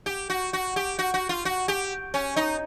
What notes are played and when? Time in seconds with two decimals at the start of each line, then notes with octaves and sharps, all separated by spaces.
0.06 G4
0.30 F#4
0.53 F#4
0.76 G4
0.99 F#4
1.14 F#4
1.29 F4
1.45 F#4
1.68 G4
2.14 C#4
2.36 D#4